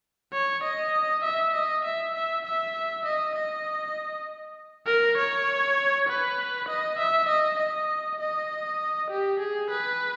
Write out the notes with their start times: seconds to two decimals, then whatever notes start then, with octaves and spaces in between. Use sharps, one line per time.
0.33 C#5
0.63 D#5
1.24 E5
1.54 D#5
1.85 E5
2.15 E5
2.45 E5
3.05 D#5
3.35 D#5
4.86 A#4
5.18 C#5
6.08 B4
6.68 D#5
6.99 E5
7.29 D#5
7.59 D#5
8.20 D#5
9.10 G4
9.40 G#4
9.70 B4